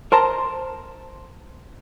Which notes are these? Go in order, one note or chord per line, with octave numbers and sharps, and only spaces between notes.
A#4 C5 A5 A#5